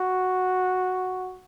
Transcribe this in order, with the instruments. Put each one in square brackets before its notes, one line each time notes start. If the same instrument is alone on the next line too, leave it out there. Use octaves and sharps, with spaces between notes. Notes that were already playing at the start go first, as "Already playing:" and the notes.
Already playing: [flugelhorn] F#4